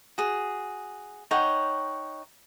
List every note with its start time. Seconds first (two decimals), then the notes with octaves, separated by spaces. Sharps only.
0.18 F#4 G#4
1.31 D#4 C#5 F#5 G5